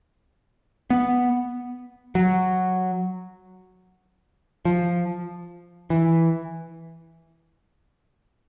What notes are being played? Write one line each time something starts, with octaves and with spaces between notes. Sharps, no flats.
B3
F#3
F3
E3